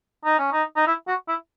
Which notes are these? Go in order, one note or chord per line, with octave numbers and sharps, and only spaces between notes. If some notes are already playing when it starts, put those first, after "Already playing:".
D#4
C#4
D#4
D#4
E4
F#4
E4